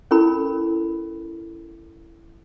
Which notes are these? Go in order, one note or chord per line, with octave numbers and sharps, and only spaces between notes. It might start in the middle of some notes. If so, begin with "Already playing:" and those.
C#4 E4 A4 A#4 B5